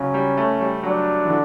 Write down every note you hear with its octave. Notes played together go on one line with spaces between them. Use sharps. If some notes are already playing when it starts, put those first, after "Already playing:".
Already playing: C#3 F#3 C#4
G3
A3
G3
F#3 D4
E3
D3